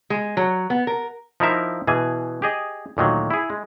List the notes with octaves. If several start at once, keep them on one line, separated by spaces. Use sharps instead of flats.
G#3
F#3
B3
A#4
F3 D#4 E4 A#4 E5 F5
B2 E3 G#4 G#5
G4 G#4 D#5
D2 A#2 D#3 F#3
E4 G#4
G#3